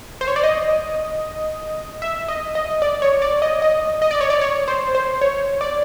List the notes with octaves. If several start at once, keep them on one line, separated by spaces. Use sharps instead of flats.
C5
C#5
D5
D#5
E5
D#5
D#5
D5
C#5
D5
D#5
D#5
D#5
D5
C#5
D5
C#5
C5
C5
C#5
D5